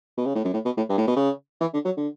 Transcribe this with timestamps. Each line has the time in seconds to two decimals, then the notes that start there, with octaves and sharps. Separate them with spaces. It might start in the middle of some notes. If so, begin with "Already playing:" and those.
0.18 B2
0.26 C#3
0.35 A2
0.44 F#2
0.54 A2
0.65 B2
0.77 A2
0.89 G2
0.98 A2
1.07 B2
1.16 C#3
1.61 E3
1.73 D3
1.85 F#3
1.97 D3